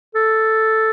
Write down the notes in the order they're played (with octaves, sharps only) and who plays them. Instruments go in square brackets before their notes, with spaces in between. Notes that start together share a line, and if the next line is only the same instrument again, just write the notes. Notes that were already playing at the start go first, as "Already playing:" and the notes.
[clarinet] A4